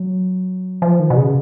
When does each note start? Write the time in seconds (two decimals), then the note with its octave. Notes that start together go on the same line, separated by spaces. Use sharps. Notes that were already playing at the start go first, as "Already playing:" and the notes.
Already playing: F#3
0.82 F3
1.00 D#3
1.10 B2
1.17 C#3